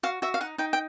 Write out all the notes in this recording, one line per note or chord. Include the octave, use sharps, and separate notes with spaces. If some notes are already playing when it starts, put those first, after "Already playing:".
F#4 F5
F#4 E5
F5
D#4 F#5
D#4 G5
G5